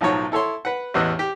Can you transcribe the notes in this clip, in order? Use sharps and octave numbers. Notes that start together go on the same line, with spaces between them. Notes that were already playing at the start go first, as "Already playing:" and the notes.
B1 A2 F3 F#3 D#4 C#5
E4 A4 C#5 C6
B4 F#5
A1 E2 E3 D#5 F#6
G4